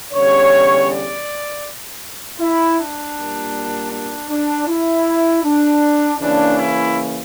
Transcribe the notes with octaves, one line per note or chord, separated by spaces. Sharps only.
E2 D3 G3 C#4 C#5
D5
E4
D4
A#2 G3 A#3
D4
D4
E4
D4
C#3 E3 A#3 C#4 D4
E4